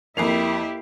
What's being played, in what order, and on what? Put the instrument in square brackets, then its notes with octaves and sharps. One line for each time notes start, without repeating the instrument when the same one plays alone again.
[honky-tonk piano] F2 C7 F7 [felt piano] A#3 [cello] E4 G4